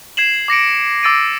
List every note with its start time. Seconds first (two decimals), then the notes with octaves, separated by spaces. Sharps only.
0.17 G#6 C7 E7 F#7
0.48 D6 A#6 C#7 D7
1.03 D6 E6 A6 D7 D#7